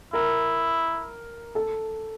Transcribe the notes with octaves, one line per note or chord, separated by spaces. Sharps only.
E4 A#4
A4